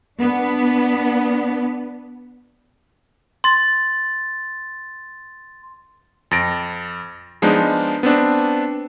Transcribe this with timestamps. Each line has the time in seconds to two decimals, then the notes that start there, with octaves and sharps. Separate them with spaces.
0.21 B3 D4
3.44 C6 A6
6.31 F2 A6 A#6 D7
7.42 F3 G#3 B3 D4 D#4
8.03 B3 C4 D4